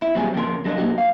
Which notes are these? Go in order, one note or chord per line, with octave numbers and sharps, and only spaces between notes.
E4
A#2 F#3 G3 C4 G4 G#4
F2 A#2 C#3 G#4 A#4 C6
F#3 A3 D4 D#5
A#2 F#3 A#3 D#4 F#4 G4
F5